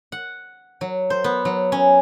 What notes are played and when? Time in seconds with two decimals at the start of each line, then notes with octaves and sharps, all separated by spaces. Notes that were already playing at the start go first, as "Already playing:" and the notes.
0.12 F#5
0.81 F#3
1.10 C5
1.24 B3
1.45 F#3
1.72 C#4